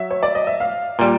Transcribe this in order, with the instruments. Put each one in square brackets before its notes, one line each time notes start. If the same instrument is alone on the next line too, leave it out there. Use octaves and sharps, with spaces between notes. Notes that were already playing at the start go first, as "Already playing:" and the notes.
Already playing: [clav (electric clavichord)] F#3 [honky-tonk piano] E5
[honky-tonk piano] C#5
D5
D#5
E5
F5
[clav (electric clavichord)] A#2 G3